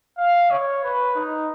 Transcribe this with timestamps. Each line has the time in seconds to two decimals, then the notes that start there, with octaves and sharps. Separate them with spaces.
0.18 F5
0.50 C#5
0.84 B4
1.16 D#4